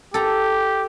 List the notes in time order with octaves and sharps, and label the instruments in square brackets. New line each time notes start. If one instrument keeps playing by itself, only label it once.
[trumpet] G4 [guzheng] A4 A#5